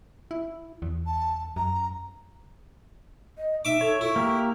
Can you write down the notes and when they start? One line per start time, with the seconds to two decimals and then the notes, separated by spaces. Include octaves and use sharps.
0.31 E4
0.82 E2
1.06 A5
1.56 F#2 A#5
3.38 D#5
3.65 D#4 E5 D6
3.81 A4 C#5
4.01 E4 C#6
4.16 A#3 G4 A#4